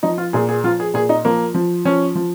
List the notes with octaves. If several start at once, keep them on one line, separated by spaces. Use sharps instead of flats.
F3 D#4
F4
A#2 G#4
G#4
F3 F4
G#4
A#2 G#4
D#4
F3 A#3
F3
F3 C#4
F3